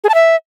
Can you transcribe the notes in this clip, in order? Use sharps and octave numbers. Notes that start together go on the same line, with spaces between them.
G#4
A5
E5